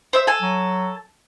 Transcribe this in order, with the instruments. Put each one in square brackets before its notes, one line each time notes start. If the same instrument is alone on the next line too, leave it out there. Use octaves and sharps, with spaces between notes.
[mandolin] C5 E5 E6
A4 G#5
[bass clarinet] F#3